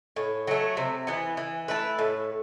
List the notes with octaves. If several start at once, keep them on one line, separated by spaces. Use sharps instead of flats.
A2
F#3 A3
C3
E3 B3
E3
A3 E4 B4
A2